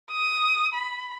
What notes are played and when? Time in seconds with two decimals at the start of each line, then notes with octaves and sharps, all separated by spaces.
0.11 D#6
0.74 B5